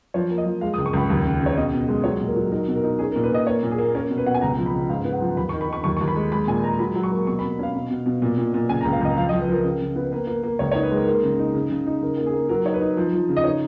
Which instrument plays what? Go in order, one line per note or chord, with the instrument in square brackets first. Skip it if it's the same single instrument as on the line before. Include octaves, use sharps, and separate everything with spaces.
[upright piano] F3 C#5
A#3
D#5
F3
G#3 F5
D#6
C#2
C#6
C#2 B5
D#2
C#3
C#3
C#5
B2 D#5
B2
G#3
F#3 C#5
A#2
A#4
F#3
D#4 A#4
B2
A#4
D#4
C#4 G#4
A#4
A#2
B4
A#2 D#5
A#3 C#5
A#2
G#4
A#3
C#4 A#4
B2
B4
B2 F#5
G#5
C#2 A#5
F3
B5
C#3
G#2 F5
B3
F#5
F3
D#2 B5
C#6
D#3
B5
D#3 C#6
D#2 C#6
D#2 C#6
B5
G#3
G#3 B5
A#2 G#5
G#3 A#5
F#3 B5
F#3
C#6
A#3
B2 C#6
B5
B2
C#4 F5
B2
B2
B2
A#2
A#2
A#2
C#3 G#5
A#5
C#2
F5
C#2 D#5
F3 F5
D#5
F3
B4
F3 A#4
C#3 A#4
C#3
B3
A#3 B4
A#3
A#3
C#2 C#5
C#5
D#4
B4
G#3 A#4
A#3
C#3
D#4
C#3
C#3
D#4
C#3 A#4
A#3
G#4
A#3
F#3 A#4
D#4 C#5
B4
D#4
F3
F3
C#3
D#5
D#4 C#5